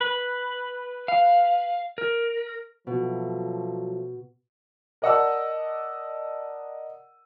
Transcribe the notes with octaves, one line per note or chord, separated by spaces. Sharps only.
B4
F5
A#4
B2 F3 F#3 A3
A#4 D5 D#5 F#5 A5 E6